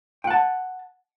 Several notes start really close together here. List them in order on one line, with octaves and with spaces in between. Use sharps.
G5 F#5 A5